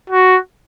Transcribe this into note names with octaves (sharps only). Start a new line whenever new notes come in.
F#4